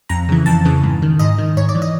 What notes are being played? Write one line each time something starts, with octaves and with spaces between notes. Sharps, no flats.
F2 A#5
C#3 E3
F2 A5
C#3 E3
G#2
D#3
G#2 D#5
D#3
G#2 C#5
D5
E3
D#5